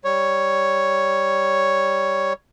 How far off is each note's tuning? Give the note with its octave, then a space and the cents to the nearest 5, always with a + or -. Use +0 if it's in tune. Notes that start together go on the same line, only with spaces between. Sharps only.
G3 +0 C#5 +0